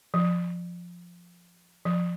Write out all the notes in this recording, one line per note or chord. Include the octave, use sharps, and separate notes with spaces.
F3
F3